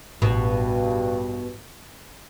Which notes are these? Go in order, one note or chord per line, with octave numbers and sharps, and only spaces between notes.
A1 G2 B2